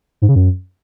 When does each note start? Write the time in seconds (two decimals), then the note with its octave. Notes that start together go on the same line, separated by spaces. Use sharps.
0.22 G#2
0.29 C#3
0.36 F#2